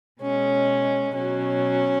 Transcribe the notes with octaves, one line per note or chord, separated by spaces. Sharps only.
B2 G#3 C#4
B2 F#3 C#4